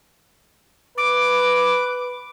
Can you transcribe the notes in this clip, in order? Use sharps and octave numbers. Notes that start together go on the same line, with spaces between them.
B4 D6